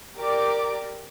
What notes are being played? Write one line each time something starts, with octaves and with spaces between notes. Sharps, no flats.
G4 A#4 D5 D6